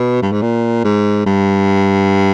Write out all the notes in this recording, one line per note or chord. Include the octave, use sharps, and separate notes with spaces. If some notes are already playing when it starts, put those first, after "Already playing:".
Already playing: B2
G2
G#2
A#2
G#2
G2